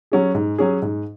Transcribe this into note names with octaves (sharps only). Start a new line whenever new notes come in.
F#3 C#4 G#4
G#2
F#3 C#4 G#4
G#2